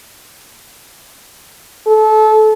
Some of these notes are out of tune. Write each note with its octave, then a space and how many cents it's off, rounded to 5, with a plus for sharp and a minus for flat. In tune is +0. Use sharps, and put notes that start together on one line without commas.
A4 -25